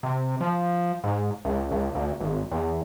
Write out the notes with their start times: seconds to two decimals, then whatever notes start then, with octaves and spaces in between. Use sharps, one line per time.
0.03 C3
0.41 F3
1.04 G#2
1.45 C#2
1.71 C#2
1.95 D2
2.20 G#1
2.51 E2